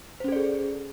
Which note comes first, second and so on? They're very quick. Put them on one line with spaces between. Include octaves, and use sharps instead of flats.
C5 C#4 A4 D5 G#4